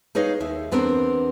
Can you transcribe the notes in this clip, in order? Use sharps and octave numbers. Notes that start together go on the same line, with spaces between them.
D#4 G#4 B4 C#5 D#5 F5
D#2 E5
E2 B3 C4 D4 A#4